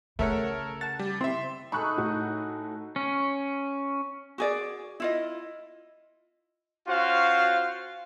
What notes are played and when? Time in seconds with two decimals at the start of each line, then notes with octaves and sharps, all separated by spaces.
0.19 C#3 A3 A4 A#4 C#5 E5 F#5
0.81 F#5 A5 A6
0.99 G3
1.21 C4 E4 E5 C6
1.72 D#4 G#4 A4 B5 C#6 F#6
1.98 A2 F#4
2.96 C#4
4.38 F#4 G#4 D5
5.00 E4 F4 D#5
6.87 C#4 F4 F#4 C5 F5